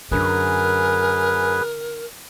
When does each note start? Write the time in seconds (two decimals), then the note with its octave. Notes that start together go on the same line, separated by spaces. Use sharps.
0.11 F#2 D3 G#4 A#4 B4